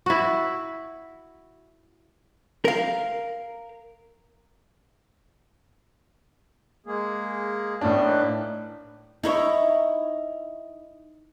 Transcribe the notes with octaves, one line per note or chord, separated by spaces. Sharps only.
E4 F#4
A#4 F5
G#3 A#3 G#4
A2 A3 B3 C#4 D4
A#3 D#4 B4
D#4 E4 C#5